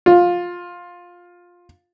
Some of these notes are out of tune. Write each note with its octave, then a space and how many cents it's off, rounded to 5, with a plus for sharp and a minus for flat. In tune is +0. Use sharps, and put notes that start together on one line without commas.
F4 +15